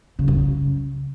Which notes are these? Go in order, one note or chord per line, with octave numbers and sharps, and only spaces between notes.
C#3
F#2
C#3